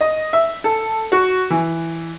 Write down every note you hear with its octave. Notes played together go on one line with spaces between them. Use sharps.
D#5
E5
A4
F#4
E3